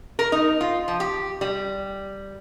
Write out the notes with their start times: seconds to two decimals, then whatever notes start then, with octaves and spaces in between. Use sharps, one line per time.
0.19 A#4
0.32 D#4
0.61 F4
0.88 F3
1.00 G4
1.41 G3